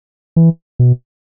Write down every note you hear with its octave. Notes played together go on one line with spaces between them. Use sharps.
E3
B2